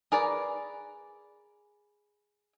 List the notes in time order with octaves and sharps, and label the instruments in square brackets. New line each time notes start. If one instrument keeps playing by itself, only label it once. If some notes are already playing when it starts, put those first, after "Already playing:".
[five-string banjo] G#4 A#4 B4 D5